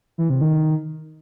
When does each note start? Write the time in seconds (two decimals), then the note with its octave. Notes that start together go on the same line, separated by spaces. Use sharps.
0.18 E3
0.30 C3
0.41 D#3